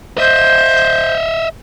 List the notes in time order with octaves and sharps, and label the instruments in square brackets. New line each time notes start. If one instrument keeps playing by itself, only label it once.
[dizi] C5 [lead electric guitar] D#5 E5